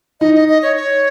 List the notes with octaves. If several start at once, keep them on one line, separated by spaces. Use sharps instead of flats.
D#4 D#5
D#5
D#5
C#5
C#5